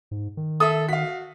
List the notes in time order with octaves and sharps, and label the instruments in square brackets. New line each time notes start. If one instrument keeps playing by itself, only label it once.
[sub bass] G#2
D#3
[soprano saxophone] A4 [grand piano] E5 D#6
[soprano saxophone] F#4 [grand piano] F5 B6